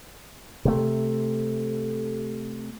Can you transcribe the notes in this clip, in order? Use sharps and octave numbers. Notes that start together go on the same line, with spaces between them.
C3 A3